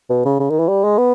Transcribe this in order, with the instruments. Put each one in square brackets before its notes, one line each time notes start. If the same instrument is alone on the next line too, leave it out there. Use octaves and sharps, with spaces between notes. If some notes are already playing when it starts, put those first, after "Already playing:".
[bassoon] B2
C#3
C#3
D#3
E3
G3
G#3
B3